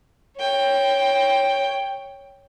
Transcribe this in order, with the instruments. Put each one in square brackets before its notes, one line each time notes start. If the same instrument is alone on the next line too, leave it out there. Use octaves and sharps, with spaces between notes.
[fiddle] C#5 G5